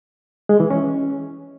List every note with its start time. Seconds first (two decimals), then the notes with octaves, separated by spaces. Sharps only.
0.49 G#3
0.60 E3
0.70 C#4